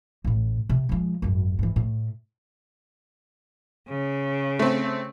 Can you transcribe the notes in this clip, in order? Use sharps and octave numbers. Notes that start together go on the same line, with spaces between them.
A1 A2
C3
F3 G#3
G#1 F#2
G#2 E3
A2
C#3
A3 C4